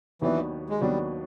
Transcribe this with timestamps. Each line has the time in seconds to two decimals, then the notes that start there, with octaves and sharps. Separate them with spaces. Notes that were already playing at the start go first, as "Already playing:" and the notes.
0.22 D#2 D#3 E3 F#3 B3 D4
0.70 G#3
0.81 D#2 D#3 F#3 G3 B3 D4